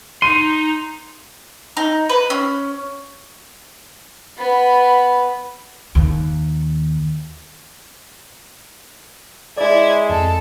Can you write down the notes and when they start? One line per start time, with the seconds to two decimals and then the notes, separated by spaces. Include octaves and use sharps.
0.22 D#4 C6 D#7
1.77 D#4
2.09 B4
2.30 C#4
4.38 B3 B5
5.95 D#2
9.58 G#3 E4 D5 G#6
10.09 F2 A4